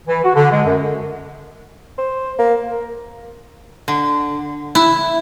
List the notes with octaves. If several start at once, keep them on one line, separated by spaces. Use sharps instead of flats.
E3
F#4
D3
G#3
F#2
C5
A#3
D3
E4